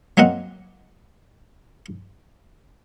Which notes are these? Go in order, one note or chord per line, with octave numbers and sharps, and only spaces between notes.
F#3 A#3 C4 D#5 F#5